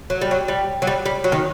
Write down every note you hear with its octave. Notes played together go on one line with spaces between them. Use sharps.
F#3
G3
F#3
G3
F#3
G3
G3
F#3
D#3